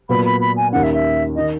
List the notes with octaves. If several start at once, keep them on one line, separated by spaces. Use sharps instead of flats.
A#2 F#3 B3 B5
B5
B5
G#5
D#2 D#3 A#3 C#4 F#5
E5
E5
D#3 D#5